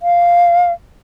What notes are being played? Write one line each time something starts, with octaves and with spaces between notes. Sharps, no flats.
F5